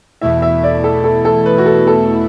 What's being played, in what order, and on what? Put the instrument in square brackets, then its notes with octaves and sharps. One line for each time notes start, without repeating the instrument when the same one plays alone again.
[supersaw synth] E2 B2 A3 E4 [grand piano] E5
[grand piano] E5
D5
A4
A4
A4
B4
F#4
A4
A4